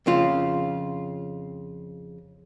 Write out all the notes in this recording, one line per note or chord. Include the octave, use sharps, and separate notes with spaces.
F2 C#3 F4